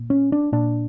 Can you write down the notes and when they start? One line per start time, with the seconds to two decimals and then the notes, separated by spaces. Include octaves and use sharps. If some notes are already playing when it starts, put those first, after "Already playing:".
Already playing: A#2
0.10 C#4
0.32 D4
0.52 A#2 D4